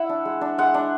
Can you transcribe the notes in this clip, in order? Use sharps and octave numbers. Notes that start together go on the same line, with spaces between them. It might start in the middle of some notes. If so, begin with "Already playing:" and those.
Already playing: E4 E5 F#5
D4
G#3
D4
G#3 F#5
D4